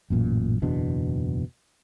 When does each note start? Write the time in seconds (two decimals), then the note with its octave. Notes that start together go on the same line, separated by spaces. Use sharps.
0.10 A1 F#2 A#2
0.62 F#1 E2 B2 D4